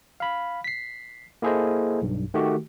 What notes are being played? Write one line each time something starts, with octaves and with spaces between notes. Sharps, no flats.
F5 B5
B6 C7
A#3 E4 G#4 A4 C5 D#5
B1 G2
D#3 A3 F#4 G4